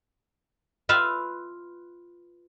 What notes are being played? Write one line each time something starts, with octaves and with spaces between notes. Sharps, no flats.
F4 B4 E5 F5